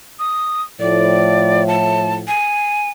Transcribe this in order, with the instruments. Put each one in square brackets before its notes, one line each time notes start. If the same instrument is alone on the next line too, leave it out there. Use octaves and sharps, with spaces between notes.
[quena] D#6
[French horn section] A2 F3 [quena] D5
[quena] A5
G#5